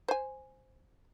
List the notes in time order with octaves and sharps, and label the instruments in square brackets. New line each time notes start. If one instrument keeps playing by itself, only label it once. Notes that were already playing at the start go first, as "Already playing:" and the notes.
[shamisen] C5 G#5